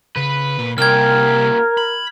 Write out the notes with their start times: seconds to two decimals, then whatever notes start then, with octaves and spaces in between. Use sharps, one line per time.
0.16 C#3 B4
0.59 A#2
0.78 C2 A#2 G4 A#4 F6 G#6
1.77 B5